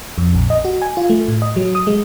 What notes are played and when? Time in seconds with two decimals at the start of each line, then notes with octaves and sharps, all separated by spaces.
0.18 F2
0.35 A#1
0.50 D#5
0.65 F#4
0.82 G#5
0.97 F4
1.10 A3
1.28 A2
1.42 D#5
1.56 F#3
1.75 D#6
1.87 G#3